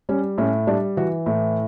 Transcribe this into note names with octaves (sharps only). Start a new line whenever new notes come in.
G3 C#4
A2 C#4
G3 D4
E3 F#4
A2